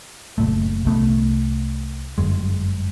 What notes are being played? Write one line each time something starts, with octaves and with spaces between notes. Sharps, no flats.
F#1 A#2 A3
C2 A3 B3
G1 F#2 G#3